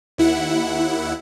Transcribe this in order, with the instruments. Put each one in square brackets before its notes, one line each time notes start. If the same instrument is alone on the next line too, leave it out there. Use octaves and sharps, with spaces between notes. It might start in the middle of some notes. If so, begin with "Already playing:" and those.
[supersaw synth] D#2 E4 F#5